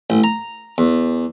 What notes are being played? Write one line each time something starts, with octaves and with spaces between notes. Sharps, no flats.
A1
A#5
E2